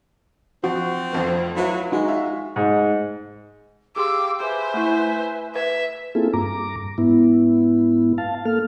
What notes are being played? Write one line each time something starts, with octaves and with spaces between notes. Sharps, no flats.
F3 C4 F#4
F1 F2 F3
F#3 E4 F4 B4
G#3 D#4 F#4
F4 E5
G#2
G4 G#4 F5 G5 C6 D6 E6
G#4 B4 C5 E5 G#5
A3 E4
B4 E5
A#3 C4 E4 F4 G#4 A4
G2 A#5 D6
G#2 B3 E4
F5 A5
A#3 A4 F6